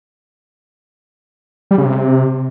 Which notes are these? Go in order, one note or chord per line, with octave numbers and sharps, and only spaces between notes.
G3
C#3
C3